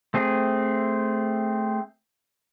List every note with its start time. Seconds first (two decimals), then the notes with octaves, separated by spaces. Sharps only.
0.14 A3 C4 G#4